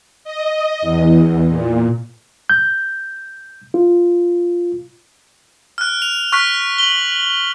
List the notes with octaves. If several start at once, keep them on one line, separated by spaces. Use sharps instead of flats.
D#5
E2
A#2
G6
F4
F6 F#6
F7
C#6 F6 F#6 B6
F#7 G7